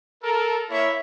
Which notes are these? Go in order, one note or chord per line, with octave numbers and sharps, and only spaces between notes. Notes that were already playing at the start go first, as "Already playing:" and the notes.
A4 A#4
A#3 E4 C#5 E5